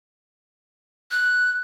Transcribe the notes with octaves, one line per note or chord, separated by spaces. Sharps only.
F#6